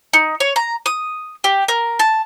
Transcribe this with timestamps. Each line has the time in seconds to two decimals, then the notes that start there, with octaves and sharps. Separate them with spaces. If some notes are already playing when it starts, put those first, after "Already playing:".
0.13 D#4
0.40 C#5
0.56 A#5
0.86 D#6
1.44 G4
1.68 A#4
1.99 A5